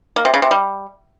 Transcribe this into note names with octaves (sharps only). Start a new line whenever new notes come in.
A#3
C3
C#3
C3
G3